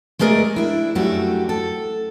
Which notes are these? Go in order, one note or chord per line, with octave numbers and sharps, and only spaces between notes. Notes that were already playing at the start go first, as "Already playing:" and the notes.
G#3 A3 G#4 A#4 D5
D4 E4
F#2 G3 A3 D4 F#4 G4
A4